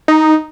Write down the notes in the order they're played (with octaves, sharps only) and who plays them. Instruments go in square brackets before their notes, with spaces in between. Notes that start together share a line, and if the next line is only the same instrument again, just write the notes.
[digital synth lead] D#4